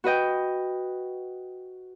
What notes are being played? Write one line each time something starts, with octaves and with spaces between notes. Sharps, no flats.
F#4 B4 D#5 G5